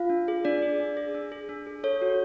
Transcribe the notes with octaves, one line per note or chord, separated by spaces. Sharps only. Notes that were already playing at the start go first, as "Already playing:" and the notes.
Already playing: F4 F5
D4
G#4
D4 D5
G#4
D4
G#4
D4
G#4
D4
G#4
A4 C#5
F#4